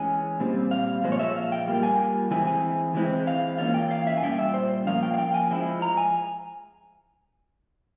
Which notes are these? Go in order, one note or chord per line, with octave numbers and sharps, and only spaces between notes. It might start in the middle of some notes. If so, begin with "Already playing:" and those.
Already playing: E3 G#3 C#4 G#5
A#2 G3 C4
F5
A#2 F3 G#3 C5
C#5
E5
F5
G5
G3 A#3 F4
G#5
E3 G#3 C4 E4 G#5
G#5
E3 G#3 C4 E4
F5
E3 G3 A#3 C#4 F4 F5
G5
F5
E5
G#5
A#2 G3 C#4 F4 G5
E5
C5
F3 A#3 C#4 F4 F5
G5
F5
G5
G#5
F3 G#3 E4
A#5
G#5